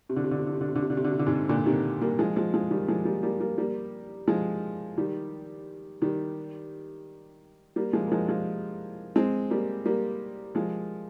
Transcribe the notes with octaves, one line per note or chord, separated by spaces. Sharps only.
C3
D3
C3
D3
C3
D3
C3
D3
C3
D3
C3
D3
C3
D3
C3
D3
G#2 C3
A#2 D3
C3 D#3
G3 A#3
F3 G#3
F3 G#3
F3 G#3
D#3 G3
F3 G#3
G3 A#3
G3 A#3
G3 A#3
G3 A#3
F3 G#3
D#3 G3
D#3 G3
G3 A#3
F3 G#3
A#3
F3 G#3
F3 G#3
G#3 C4
G3 A#3
G3 A#3
F3 G#3